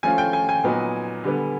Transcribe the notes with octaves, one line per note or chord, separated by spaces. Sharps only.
F3 A3 C#4 F4 G#5
G5
G#5
G#5
A#2 F#3 B3 D#4
D3 G3 B3